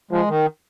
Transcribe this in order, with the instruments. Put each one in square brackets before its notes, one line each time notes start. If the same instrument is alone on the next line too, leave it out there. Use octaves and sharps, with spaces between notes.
[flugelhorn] F3 [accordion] G#3
[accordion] D#3